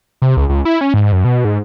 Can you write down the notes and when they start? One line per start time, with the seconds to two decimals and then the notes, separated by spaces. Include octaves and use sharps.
0.22 C3
0.37 C#2
0.49 C#2
0.65 E4
0.81 C#4
0.94 G#2
1.12 F#2
1.25 B2
1.45 G#2